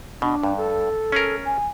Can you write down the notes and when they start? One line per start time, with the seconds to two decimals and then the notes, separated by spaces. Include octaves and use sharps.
0.22 B2 D4
0.43 G2
0.57 A4
1.12 C#4 G#4 A#4
1.45 G#5